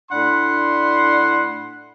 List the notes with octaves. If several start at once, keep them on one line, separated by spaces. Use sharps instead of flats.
A2 D4 F#5 B5 C6